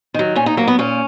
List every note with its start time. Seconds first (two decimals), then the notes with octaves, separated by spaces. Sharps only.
0.14 D#3 F#3
0.35 A#2 C#4
0.46 D#4
0.57 F#3 A#3
0.67 B3
0.79 A#2 C#4